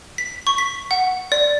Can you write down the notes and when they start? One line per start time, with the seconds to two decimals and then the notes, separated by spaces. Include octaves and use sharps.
0.18 B6
0.47 C#6
0.58 B6
0.91 F#5
1.32 D5